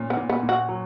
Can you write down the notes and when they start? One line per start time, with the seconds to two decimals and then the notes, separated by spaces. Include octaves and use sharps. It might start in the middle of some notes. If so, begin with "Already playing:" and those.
Already playing: A#2 C#4
0.10 B3
0.17 A#2
0.29 B3
0.43 A#2
0.49 F#4
0.69 F#3